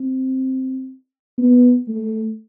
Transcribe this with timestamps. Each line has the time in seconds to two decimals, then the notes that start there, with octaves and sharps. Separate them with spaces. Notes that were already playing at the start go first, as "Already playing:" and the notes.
Already playing: C4
1.38 B3
1.88 A3